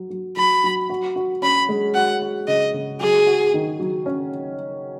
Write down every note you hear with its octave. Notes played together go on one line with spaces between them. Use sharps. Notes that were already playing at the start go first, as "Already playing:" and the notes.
Already playing: F#3
F#3
F#3 B5
F#3
F#4
F#4
C#4 B5
G#3
F#4 F#5
F#4
C#3 D#5
C#3
F#3 G#4
F#4
D#3
F#3
C#4